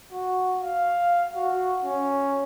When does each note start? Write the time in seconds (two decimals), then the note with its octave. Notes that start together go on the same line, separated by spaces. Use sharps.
0.12 F#4
0.61 F5
1.36 F#4
1.84 C#4